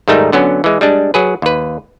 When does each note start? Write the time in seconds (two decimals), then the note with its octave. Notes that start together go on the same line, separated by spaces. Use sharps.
0.08 G#2 D#3 G3 A3 D#4
0.32 D3 F#3 B3 C#4
0.64 E3 G#3
0.81 G3 G#3 D4
1.14 F#3 G#4 B4
1.42 D#2 B4